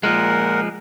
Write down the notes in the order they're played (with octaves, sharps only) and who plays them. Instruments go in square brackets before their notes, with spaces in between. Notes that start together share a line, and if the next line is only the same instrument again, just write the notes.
[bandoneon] A#2 A#4 F#5 [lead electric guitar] F3 G#3